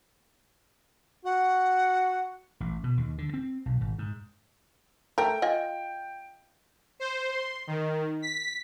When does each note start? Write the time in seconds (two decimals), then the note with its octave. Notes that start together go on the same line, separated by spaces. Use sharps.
1.25 F#4 F#5
2.60 A1
2.84 B2
2.97 D#2
3.18 D3
3.34 C4
3.66 B1
3.81 G#1
3.98 G#2
5.18 A3 A#4 G5
5.42 F4 D#5 G#5
7.00 C5
7.30 C6
7.67 D#3
8.22 B6